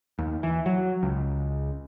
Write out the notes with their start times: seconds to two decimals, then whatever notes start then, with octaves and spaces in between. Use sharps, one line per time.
0.19 D#2
0.43 E3
0.66 F#3
1.03 C#2